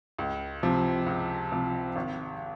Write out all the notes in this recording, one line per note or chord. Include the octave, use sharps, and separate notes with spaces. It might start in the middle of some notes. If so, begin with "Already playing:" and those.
C#2
C3 F3
C#2
C3 F3
G#1